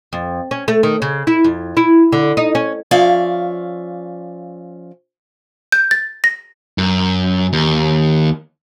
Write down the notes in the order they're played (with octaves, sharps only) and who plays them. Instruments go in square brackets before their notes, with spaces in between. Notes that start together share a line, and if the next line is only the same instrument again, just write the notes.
[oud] F2
C#4
A3
D#3
C#3
E4
F2
E4
D3
D#4
C#4
[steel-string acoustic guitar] F3 C#4 D5 E5 F5
[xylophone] G6
A6
A#6
[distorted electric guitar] F#2
D#2